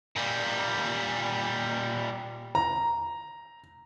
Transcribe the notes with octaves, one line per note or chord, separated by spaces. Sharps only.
A#2 G3
A#5